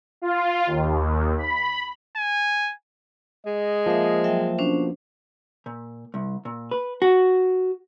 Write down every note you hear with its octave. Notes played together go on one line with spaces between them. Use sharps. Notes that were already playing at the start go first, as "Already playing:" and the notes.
F4
D#2
B5
G#5
G#3 D#5
F3 A#3 C5 E5
F#3 E5 G5
B2 C#4 D4 C5
A#2
C2
A#2
B4
F#4